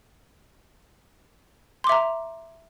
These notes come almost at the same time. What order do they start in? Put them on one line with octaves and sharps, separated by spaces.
C6 D6 E5 A#5